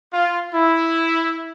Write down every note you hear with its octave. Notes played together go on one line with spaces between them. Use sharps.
F4
E4